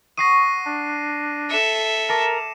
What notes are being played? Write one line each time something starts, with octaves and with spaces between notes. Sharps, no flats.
F#5 C#6 D#6 A#6 C7 D#7
D4
A4 E5 C#7 E7
A#4 A5 A#5 D6